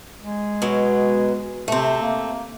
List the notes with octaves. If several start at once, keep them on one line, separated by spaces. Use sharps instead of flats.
G#3
B2 F#3
C3 A3 C4
A#3